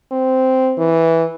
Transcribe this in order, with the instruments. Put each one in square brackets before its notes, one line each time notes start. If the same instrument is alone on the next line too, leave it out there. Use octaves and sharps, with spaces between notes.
[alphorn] C4
E3